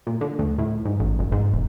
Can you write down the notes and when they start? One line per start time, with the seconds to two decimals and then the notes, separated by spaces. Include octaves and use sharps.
0.07 A#2
0.21 D3
0.39 D2
0.58 A2
0.85 G#2
1.00 A1
1.19 F#1
1.32 G#2
1.54 E1